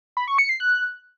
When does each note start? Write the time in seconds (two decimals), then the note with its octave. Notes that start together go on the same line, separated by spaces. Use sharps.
0.17 B5
0.28 C#6
0.38 C#7
0.49 C7
0.60 F#6